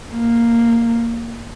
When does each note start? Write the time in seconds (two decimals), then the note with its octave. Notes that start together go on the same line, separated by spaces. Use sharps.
0.13 A#3